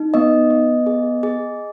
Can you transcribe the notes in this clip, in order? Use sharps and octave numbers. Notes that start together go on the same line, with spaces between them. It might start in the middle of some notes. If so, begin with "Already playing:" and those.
Already playing: D#4
B3 D#5
B3
G#4
G#4